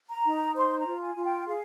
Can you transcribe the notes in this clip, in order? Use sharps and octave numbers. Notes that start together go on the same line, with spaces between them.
A#5
D#4
C5 C6
A#5
F4
G#5
F4
G5
G#4 F5